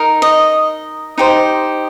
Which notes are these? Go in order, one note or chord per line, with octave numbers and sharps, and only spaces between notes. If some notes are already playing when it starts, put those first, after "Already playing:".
Already playing: D#4 A#4
D#5
D#4 G4 C5